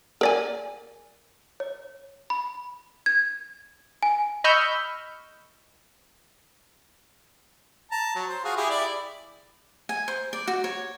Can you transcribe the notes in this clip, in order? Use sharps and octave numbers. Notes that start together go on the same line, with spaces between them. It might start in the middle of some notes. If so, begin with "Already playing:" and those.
A#4 D5 G#5
C#5
B5
G#6
G#5
D#5 B5 C#6 E6 F6 G6
A5 A#5
F#3
C5
F4 F#4 G#4
E4 G4 G#4
E4 D5
G#5
C5
D5
F#4
C#5